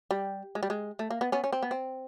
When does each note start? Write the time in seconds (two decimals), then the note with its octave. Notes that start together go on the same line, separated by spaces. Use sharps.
0.11 G3
0.55 G#3
0.63 G3
0.70 G#3
0.99 A3
1.10 A#3
1.21 B3
1.32 B3 C#4
1.44 C#4
1.53 C4
1.63 B3
1.71 C4